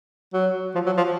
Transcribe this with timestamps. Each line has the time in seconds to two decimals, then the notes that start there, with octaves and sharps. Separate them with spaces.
0.34 F#3
0.75 F3
0.86 F#3
0.97 F3